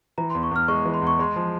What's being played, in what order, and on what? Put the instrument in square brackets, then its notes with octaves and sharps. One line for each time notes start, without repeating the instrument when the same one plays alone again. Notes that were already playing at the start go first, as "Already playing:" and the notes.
[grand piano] E3 [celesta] A#5
[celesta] C6
[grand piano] E2
[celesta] C#6
[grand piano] E2 [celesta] F6
[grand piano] G#3 [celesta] C#6
[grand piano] E3
[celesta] C6
[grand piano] E2
[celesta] C#6
[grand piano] G#3 [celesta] C6
[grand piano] F3